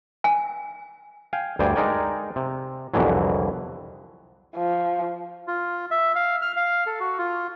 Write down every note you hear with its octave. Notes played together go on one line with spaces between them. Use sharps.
G#5
F5 G5 G#5
D2 G2 C5 D5 G5 G#5
G#3 D#4 A#4 D5 G5 G#5
C3
C2 F2 B2 D3 E3 F#3
F3
F4
E5
F5
F6
F5
A4
F#4
F4